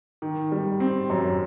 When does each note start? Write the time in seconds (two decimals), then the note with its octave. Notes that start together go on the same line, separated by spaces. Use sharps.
0.22 D#3
0.52 G3
0.80 C4
1.10 F#2